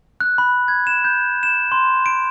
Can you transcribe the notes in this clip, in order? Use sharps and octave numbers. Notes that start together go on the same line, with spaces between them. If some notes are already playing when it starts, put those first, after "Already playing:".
F#6
B5
G#6
E7
G6
E7
C6
D7